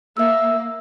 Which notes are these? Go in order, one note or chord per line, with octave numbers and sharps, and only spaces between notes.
A#3 E5 E6